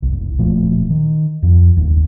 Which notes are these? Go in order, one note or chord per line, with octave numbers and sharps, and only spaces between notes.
F#1 C2
D1 A#2 F3 A3
D#3
F2 F3
F#1 D#2